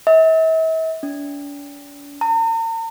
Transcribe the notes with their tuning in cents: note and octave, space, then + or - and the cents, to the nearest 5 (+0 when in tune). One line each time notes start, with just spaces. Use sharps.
E5 -40
D4 -45
A#5 -45